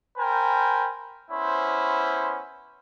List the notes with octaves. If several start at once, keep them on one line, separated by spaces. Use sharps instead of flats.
A#4 C5 G5 G#5 B5
B3 C#4 E4 C5